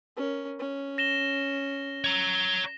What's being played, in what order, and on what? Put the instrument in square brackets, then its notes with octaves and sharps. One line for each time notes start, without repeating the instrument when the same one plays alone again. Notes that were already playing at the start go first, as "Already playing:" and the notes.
[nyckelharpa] C#4 A#4
C#4
[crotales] A#6 E7 G7
[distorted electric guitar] C#5 A#5